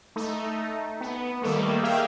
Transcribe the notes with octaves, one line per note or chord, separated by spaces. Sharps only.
A3 D#4
B3
D#3 G3 A3 A#3
G4 G#4 A#4 E5 F5 G5